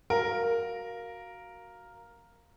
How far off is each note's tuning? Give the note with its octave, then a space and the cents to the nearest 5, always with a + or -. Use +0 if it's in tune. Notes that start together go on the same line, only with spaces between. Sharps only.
F#4 +5 A#4 +0 F5 +0